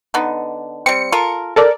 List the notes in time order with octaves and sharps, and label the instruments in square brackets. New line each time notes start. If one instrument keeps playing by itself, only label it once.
[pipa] D3 B3 D#4
[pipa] G3 C4 [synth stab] C#7
[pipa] F4 A4 A#4
[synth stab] A4 A#4 D5